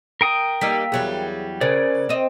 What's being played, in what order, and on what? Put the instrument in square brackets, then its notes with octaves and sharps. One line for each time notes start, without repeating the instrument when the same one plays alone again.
[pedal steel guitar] A#4 G5 D#6
[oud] G3 A#3 D#4 [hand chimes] E6 B6
[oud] E2 F#3 G3 [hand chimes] G#4
[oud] C#3 [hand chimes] A#4 C5 [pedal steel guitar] D5
[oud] C4 D#5